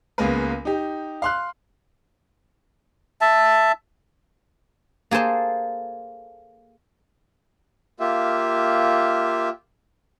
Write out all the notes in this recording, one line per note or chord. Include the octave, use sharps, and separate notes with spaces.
C#2 G#3 A#3 B3 A#4 B4
D#4 G4
F5 C6 F#6
E5 A5
A#3 G#4 A4 C5 A5
A#3 F4 G4 E5